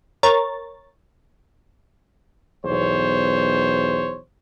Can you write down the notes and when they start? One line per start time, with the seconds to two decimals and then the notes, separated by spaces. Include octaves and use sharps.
0.23 A#4 C#5 A6
2.65 B1 E2 C5 C#5